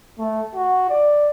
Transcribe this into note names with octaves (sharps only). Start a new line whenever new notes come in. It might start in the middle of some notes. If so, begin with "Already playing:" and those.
A3
F#4
D5